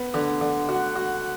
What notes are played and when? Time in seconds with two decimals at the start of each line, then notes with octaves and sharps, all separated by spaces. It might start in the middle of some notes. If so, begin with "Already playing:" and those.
Already playing: B3
0.14 D3
0.41 D3
0.69 F#4
0.96 F#4